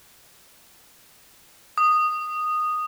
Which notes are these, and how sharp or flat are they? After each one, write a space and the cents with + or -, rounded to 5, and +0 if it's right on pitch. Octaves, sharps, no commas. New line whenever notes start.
D#6 -10